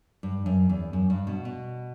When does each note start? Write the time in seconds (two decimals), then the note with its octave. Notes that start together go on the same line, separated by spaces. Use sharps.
0.23 G2
0.46 F#2
0.69 E2
0.93 F#2
1.10 G2
1.27 B2
1.45 B2